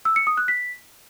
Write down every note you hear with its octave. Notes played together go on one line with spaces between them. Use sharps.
E6
C#7
D#6
F#6
B6